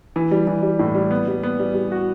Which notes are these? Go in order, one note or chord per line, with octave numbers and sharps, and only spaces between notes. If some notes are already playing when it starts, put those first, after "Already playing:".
E3
G3
E3
G3
A2
G3
B3
G3
B3
G3
G3
F#4